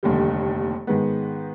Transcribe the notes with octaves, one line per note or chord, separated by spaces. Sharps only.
F1 D#2 D3 G3
G#2 D#3 G#3 B3